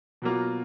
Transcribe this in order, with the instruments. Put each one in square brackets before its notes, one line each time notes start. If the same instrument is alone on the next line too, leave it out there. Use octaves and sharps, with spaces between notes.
[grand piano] B2 F#3 A#3 F4